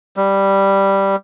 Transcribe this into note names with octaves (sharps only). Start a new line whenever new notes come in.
G3